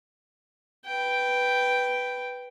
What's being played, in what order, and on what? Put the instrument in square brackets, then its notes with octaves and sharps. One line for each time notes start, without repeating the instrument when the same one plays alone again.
[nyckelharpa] B4 G5